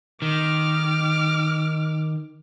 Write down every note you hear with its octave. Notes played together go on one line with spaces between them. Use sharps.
D#3 D6 F6